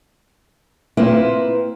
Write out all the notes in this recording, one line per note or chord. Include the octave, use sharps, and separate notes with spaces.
A#3 C4 E4 F4 B4